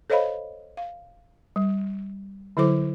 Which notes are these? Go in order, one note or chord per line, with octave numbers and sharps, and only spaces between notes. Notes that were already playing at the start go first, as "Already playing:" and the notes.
A4 C5 C#5 D#5 F5 B5
F5
G3
D3 F#3 E4 A4 C5 D6